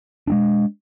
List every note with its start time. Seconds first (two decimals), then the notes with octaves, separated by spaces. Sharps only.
0.27 G#3 B3 D4